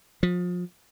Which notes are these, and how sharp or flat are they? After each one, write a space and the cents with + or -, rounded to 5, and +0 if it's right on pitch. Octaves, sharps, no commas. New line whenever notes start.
F3 +30